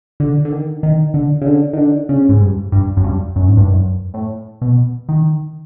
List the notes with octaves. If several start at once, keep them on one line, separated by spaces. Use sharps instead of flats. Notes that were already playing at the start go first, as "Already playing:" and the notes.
D3
D3
D#3
D#3
D3
C#3
D3
D#3
D3
C#3
G#2
G2
G2
F#2
G2
F#2
G#2
G2
F#2
A2
B2
D#3